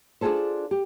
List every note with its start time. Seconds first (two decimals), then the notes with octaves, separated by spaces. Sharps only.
0.21 D4 F4 F#4 G#4 A4 C5
0.71 G4